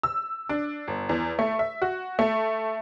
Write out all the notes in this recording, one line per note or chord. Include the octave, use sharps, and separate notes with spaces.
E6
D4
G1
E2
A3
E5
F#4
A3